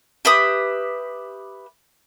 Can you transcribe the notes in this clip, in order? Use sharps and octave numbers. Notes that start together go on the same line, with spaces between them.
G4 B4 E5 D#6